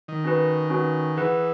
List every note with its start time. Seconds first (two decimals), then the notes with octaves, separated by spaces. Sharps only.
0.08 D#3
0.24 C#4 F#4 B4
0.70 C#4 F#4 B4
1.17 E3 G#4 B4 F#5